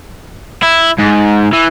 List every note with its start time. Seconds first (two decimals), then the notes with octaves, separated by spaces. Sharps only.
0.63 E4
0.98 G#2
1.53 E3